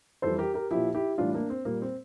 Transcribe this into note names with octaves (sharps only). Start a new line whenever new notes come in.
F2 E3 G3 A4 C5
G4 A#4
G4 A#4
A#2 F3 E4 G4
E4 G4
A2 E3 G3 D4 F4
A#3 D4
C4
A#2 G3 A#3
C4